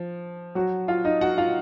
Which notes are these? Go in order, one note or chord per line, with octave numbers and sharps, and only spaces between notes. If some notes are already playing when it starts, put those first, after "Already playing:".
Already playing: F3
F#3 F#4
F4 F5
D#4 D#5
F#4 F#5
F4 F5